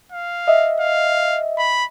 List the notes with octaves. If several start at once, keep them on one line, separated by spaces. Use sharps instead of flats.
F5
D#5 E5
F5
B5